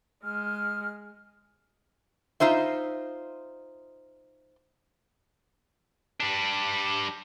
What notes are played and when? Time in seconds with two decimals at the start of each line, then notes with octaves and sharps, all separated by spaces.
0.24 G#3 F6
2.40 D#4 F4 C5 E5
6.20 G3 D4